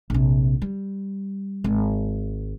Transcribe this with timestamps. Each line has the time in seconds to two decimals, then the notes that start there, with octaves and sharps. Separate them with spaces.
0.10 A#1 C3
0.62 G3
1.64 G#1